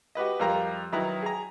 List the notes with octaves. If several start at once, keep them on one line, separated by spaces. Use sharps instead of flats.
F#4 G4 B4 D#5
F2 G3 A#4 F5 A#5
D#3 F#3 E4 B4 A#5
G#4 A#5